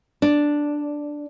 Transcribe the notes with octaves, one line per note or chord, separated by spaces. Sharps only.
D4